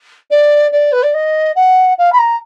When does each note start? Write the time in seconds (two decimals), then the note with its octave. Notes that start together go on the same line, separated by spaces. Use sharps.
0.30 D5
0.71 D5
0.92 B4
1.02 D5
1.14 D#5
1.55 F#5
1.98 F5
2.12 B5
2.18 A#5